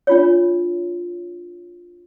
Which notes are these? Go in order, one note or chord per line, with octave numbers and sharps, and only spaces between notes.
D4 F4 C#5